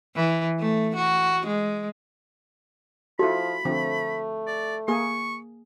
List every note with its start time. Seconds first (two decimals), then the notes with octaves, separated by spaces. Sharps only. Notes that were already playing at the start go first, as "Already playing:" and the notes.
0.16 E3
0.59 A3
0.96 F#4
1.46 G#3
3.19 F3 E4 F#4 A4 B5
3.65 D3 F3 A3 C4
4.47 D5
4.88 A#3 G#4 C#6